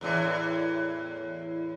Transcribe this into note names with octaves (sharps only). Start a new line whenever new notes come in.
E2 A2 E3